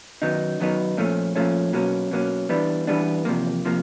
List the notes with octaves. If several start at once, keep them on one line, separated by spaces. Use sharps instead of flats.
F#2 D#3 F#3 B3 D#4
F#2 D#3 F#3 B3 D#4
A#2 F3 A3 C#4
A#2 F3 A3 C#4
B2 F#3 A#3 C#4
B2 F#3 A#3 C#4
E3 G3 B3 D4
E3 G3 B3 D4
E2 C3 F3 A#3
C3 F3 A#3